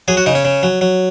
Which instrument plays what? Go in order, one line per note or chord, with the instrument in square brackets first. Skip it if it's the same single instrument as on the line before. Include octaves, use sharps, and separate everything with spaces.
[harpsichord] F#3 G#4
F#4
C#3 D#4
C#4
C#3
F#3
F#3